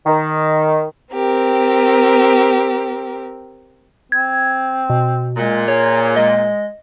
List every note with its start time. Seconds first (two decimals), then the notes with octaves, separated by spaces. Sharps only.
0.06 D#3
1.12 C4 G4 A#4
4.12 C4 G#6
4.90 B2
5.37 A#2 G#3
5.68 G#4 C#5
6.16 G#3 D#5